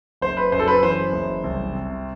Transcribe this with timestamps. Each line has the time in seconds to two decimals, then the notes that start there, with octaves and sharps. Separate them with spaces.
0.22 F#1 C5
0.37 B4
0.52 F#2 C5
0.59 A4
0.68 B4
0.83 E3 C5
1.12 F#1
1.44 C2
1.73 C3